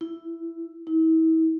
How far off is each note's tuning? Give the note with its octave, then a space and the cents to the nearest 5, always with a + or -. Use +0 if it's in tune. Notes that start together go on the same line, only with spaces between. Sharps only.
E4 +10
E4 -40